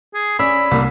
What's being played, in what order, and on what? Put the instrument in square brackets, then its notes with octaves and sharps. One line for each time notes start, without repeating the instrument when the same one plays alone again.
[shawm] G#4
[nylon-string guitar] C#4 G#4 D5 [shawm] B5 [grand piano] E6
[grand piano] C2 [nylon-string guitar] G3 A#3 D4